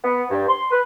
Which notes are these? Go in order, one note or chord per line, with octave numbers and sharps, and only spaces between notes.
B3
G2
C6
B4